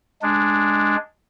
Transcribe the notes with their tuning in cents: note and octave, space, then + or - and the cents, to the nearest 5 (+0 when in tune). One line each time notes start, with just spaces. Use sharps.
G#3 +0 D4 +0